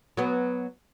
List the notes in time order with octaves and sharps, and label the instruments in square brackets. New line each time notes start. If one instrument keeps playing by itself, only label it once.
[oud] F#3 B3